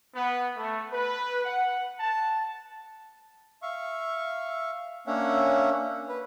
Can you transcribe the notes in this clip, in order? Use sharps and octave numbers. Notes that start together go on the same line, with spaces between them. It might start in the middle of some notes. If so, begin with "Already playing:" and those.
B3
A3
B4
F#5
A5
E5 F5 C#6
A#3 C#4 D4 C#5 E5 F#5
B4